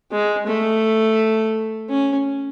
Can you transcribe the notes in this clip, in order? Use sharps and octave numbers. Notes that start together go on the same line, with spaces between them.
G#3
A3
C#4